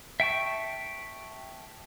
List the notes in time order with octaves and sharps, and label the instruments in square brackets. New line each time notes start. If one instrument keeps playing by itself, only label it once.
[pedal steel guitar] E5 G5 A5 C#6